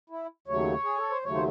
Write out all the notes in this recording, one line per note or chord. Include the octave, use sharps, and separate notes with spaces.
E4
D#2 C#3 F#3 A3 C#5
G#4
A4
C5
D#2 C#3 F#3 A3 C#5
C5